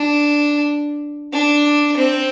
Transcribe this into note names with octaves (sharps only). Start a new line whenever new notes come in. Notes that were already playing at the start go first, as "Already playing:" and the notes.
Already playing: D4
D4
C4